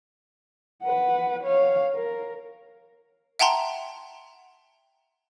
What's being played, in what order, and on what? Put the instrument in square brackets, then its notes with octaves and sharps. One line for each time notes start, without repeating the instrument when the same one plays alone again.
[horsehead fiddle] B4 F#5
C#5 F5
A#4
[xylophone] E5 F#5 G5 A5 A#5 C6